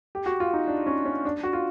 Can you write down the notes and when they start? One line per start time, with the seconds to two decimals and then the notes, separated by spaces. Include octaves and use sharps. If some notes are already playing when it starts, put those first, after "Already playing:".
0.15 G4
0.26 F#4
0.40 F4
0.54 D#4
0.68 D4
0.86 C#4
1.05 C#4
1.25 D4
1.43 F#4
1.53 F4